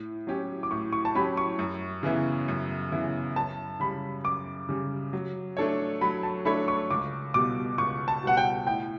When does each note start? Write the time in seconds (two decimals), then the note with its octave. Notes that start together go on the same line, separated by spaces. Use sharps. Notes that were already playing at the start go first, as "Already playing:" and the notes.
Already playing: A2
0.27 F#3 C#4 G4
0.63 D6
0.71 A2 C#6
0.92 C#6
1.05 A5
1.15 F#3 C#4 G4 B5
1.37 C#6
1.59 F#2
2.03 C#3 E3 B3 E4
2.48 F#2
2.92 C#3 E3 B3 E4
3.36 F#2 A5
3.80 C#3 G3 B5
4.24 F#2 D6
4.69 C#3 G3
5.13 F#3
5.57 A3 D4 A4 C#5
6.01 F#3 B5
6.23 A5
6.45 A3 D4 A4 C#5 B5
6.68 C#6
6.90 C#2 D6
7.34 B2 G3 B3 F#4 D6
7.78 C#2 C#6
8.08 A5
8.23 B2 G3 B3 F#4 F#5
8.37 G5
8.67 A2 G5